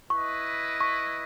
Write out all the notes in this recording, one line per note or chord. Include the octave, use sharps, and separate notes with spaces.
E4 B4 D#5 C#6
C#6